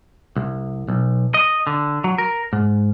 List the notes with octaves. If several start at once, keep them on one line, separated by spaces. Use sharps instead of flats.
C2
B1
D#5
D3
F#3
A#4
G#2